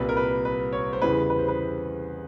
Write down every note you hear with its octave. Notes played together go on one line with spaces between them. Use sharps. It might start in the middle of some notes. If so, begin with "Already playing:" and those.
Already playing: C2 A#2 G3 B4
A#4
B4
B4
C#5
C5
E2 C#3 E3 G3 B4
B4
C5
B4